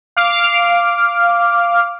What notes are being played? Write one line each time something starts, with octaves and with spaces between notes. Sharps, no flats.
F5 D6 F6